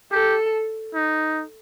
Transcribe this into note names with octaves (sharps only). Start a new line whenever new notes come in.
G4 A4
D#4